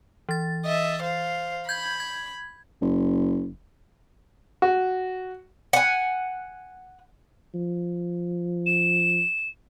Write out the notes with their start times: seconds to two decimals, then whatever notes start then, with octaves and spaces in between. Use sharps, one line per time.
0.29 E3 A6
0.66 D#5 E5
1.02 C5 F5
1.69 B5 G6 G#6
2.00 G#6
2.81 F#1
4.62 F#4
5.73 F#5 G#5
7.54 F3
8.66 E7